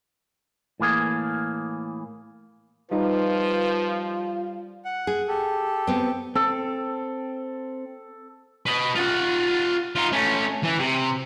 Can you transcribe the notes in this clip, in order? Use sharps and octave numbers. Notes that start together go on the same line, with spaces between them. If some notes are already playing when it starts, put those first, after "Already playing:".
A2 E3 A#3 G#4
F3 G3 D#4 F4 B4
F#5
G#4
G4 A4
B3 C4
C4 A4
B4 D#5
F4 F#5
D#4 F4
A3 C#4
E3
C3